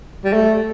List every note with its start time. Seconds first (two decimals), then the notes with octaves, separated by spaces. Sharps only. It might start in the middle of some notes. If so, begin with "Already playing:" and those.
0.24 G3
0.33 A3